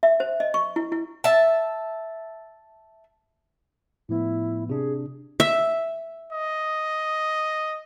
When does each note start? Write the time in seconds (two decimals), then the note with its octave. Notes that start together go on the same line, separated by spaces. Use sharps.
0.03 E5
0.20 C5
0.40 D#5
0.54 C#6
0.76 E4
0.92 E4
1.24 E5 A5
4.09 A2 F3 B3 E4
4.69 C3 D4 G#4
5.40 E5
6.33 D#5